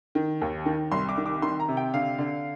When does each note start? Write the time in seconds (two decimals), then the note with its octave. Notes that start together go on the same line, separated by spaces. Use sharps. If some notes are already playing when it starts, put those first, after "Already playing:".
0.15 D#3
0.41 D#2
0.66 D#3
0.92 C2 C6
1.09 D6
1.17 D#3
1.26 D6
1.42 D#3 C6
1.60 A#5
1.68 C3
1.77 G5
1.94 D3 F5
2.18 D3